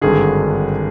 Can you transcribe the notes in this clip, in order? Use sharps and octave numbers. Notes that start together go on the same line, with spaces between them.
G#1 G2 D3 G#4